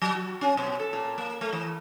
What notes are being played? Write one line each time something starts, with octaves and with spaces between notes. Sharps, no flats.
F#3
F#4
C#4
B2
A4
A#2
A#3
A3
E3